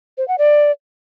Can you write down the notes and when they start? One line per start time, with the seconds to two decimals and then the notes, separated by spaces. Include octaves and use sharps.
0.18 C5
0.28 F#5
0.38 D5